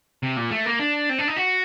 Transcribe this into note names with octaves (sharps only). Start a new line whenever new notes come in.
C3
A#2
A3
A#3
D4
C4
D4
D#4
F#4